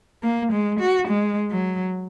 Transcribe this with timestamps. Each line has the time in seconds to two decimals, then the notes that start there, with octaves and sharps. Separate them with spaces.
0.23 A#3
0.52 G#3
0.80 F#4
1.08 G#3
1.51 F#3